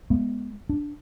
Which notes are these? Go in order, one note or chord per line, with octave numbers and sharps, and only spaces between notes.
G#3 B3
D4